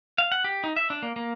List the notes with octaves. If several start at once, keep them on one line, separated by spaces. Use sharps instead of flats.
F5
F#5
G4
D#4
E5
D4
A#3
A#3